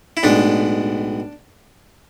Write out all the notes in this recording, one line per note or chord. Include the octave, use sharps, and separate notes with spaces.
E4
B1 A2 G#3 D4